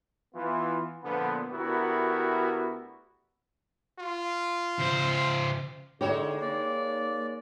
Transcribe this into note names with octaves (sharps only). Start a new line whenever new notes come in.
E3 B3 F4
A#2 D3 F3 B3
D2 B3 E4 F#4 G4 A#4
F4
C#3 C5
D3 G#3 D#4 G4 C#5
A#3 D5